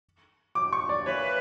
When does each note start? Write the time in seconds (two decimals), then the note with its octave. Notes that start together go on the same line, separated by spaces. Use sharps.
0.55 D6
0.73 C#6
0.89 D5
1.06 E3 A#3 E4 B4 C#5